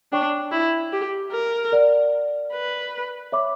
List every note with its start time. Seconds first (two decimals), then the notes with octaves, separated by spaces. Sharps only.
0.12 D4 C#5 G5 C#6
0.52 E4
0.92 G4
1.32 A#4
1.72 A#4 D5 F#5
2.53 B4
3.32 C#5 E5 B5 D6